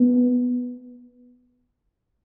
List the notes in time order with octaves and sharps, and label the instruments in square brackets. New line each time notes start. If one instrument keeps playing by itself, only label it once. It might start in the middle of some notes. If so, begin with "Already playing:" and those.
Already playing: [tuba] B3